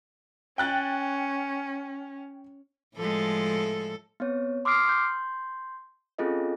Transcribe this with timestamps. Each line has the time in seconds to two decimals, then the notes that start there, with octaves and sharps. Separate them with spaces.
0.58 C#4 G5 F#6 A6
2.97 A2 F3 G#3 A4
4.20 B3 C4 C#5
4.65 C6 D6 D#6 F6 C7 D7
4.88 C6 G6
6.18 C4 C#4 F4 G#4 A4 D#5